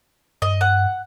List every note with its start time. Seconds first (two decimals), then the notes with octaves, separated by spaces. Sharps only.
0.42 G2 D#5
0.61 F#5